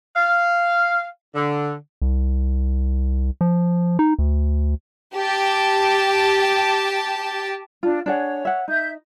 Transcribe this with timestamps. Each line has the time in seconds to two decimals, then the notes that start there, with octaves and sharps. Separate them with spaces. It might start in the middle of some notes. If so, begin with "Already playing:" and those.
0.15 F5
1.34 D3
2.02 C2
3.41 F3
3.99 D#4
4.19 D2
5.15 G4 A5
7.83 D4 F4
8.06 D4 G#4 C#5 F#5
8.45 E5 F#5
8.68 D#4 E5 G6